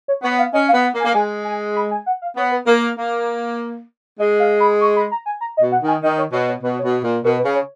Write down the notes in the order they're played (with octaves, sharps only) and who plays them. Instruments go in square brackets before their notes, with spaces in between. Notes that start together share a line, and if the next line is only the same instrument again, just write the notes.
[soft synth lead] C#5
[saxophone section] B3 [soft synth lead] C#5
[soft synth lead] F5
[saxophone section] C#4 [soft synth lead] D#5
[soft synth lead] F5
[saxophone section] B3
[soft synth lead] F#5
[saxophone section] A#3
[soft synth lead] G#5
[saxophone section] A#3
[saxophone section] G#3 [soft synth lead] G#5
[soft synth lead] G#5
B5
G#5
F#5
F5
[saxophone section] B3 [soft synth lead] C#5
[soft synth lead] B4
[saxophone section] A#3 [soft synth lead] A#4
[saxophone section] A#3
[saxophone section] G#3 [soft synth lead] D#5
[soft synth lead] F5
B5
C#6
B5
A#5
G#5
A#5
D#5
[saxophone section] B2
[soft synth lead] F#5
[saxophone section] D#3
[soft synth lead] G#5
[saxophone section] D#3 [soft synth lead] D#5
[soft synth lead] C#5
[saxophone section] B2 [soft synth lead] C#5
[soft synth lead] C#5
[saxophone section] B2 [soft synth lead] B4
[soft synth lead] C#5
[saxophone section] B2
A#2
[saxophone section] B2 [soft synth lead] A#4
[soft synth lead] B4
[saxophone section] C#3
[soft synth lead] C#5